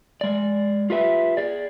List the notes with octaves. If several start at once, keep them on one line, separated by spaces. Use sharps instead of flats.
G#3 D5
F4 G4 B4 E5
G#4 D5